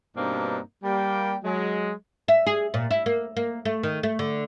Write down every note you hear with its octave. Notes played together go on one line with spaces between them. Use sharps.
G2 B2 A#3 C4 D4 D#4
G3 A#3 G5
F#3 G#3
E5
G#4
A#2
E4
A#3
A#3
A3
D#3
A3
D3